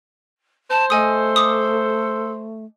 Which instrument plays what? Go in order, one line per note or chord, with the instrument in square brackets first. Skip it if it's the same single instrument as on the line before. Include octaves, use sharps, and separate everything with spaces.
[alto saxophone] C5 [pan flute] A5
[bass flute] A3 [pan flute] A4 [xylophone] D#5 G#5 D#6
[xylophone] D6 D#6